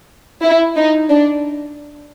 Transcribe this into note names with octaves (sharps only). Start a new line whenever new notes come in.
E4
D#4
D4